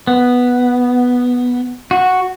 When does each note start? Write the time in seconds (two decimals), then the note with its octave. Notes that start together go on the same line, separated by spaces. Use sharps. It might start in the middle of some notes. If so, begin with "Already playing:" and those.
0.07 B3
1.91 F#4